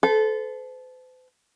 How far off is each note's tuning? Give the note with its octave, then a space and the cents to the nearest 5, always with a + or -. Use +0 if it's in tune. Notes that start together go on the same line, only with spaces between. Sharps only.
A4 -20 C5 -45